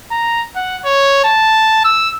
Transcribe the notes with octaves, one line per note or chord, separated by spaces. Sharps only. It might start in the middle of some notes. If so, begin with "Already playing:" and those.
A#5
F#5
C#5
A5
E6